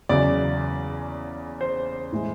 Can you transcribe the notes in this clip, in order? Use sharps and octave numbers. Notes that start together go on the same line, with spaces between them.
E2 C#3 F#3 D5
C5
A2 E3 G#3